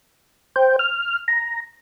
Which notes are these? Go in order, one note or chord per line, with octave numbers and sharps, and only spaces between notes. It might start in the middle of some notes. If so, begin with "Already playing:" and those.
C5 G5
F6
A#5